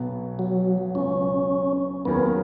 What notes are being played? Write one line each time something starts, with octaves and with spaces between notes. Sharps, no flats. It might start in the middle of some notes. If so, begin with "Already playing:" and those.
Already playing: B1 B2 F#3 B3
F#3
C#2 B2 F#3 C#4
D#2 D#3 F#3 B3 C#4 G#4